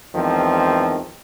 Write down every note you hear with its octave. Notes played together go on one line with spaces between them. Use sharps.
E2 D#3 F3 G#3 C4